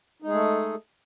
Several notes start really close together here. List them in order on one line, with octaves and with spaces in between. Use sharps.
D#4 G#3 G#4 A3 A4